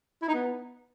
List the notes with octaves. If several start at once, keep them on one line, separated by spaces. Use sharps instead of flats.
E4
D#4
B3